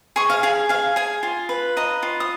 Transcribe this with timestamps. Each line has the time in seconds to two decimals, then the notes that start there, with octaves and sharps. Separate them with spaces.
0.16 G#4 C#6
0.30 F5
0.43 G#4 F5
0.69 G#4 F5
0.96 G#4 G#5
1.23 F4
1.49 B4
1.77 D#5 A#5
2.03 F4
2.20 D#6